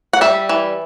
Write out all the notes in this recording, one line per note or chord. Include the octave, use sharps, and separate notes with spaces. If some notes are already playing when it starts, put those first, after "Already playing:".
F#5
G3 E5
E3